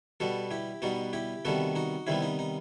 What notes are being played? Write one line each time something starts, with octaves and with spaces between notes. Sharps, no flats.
B2 G3 B3 F#4 A4
E4 G4
B2 G3 B3 D#4 F#4
E4 G4
C3 D#3 G3 B3 F#4 A4
D#4 F#4
C3 D#3 G3 B3 C4 E4
D#4
D#4